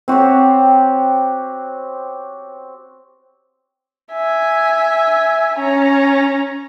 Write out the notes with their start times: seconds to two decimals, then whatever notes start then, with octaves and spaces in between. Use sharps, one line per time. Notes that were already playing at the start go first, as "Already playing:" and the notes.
0.08 C4 F#4 G4 C#5
4.12 E5 G#5
5.58 C#4 A#5